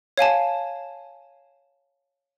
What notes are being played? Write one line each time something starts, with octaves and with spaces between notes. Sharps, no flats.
C#5 F5 G#5 A5